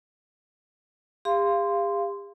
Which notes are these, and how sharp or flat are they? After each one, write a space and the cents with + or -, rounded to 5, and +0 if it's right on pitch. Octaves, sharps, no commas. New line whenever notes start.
G4 +45 F5 -20 C6 -10